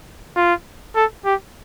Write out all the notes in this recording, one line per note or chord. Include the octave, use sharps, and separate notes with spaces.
F4
A4
G4